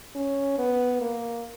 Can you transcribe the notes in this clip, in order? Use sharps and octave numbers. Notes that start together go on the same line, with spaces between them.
C#4
B3
A#3